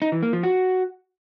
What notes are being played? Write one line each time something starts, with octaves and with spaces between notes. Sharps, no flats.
D#4
E3
A#3
F3
F#4